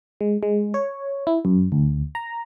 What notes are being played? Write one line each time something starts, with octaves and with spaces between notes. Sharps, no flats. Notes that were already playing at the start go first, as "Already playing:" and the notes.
G#3
G#3
C#5
E4
F#2
D2
A#5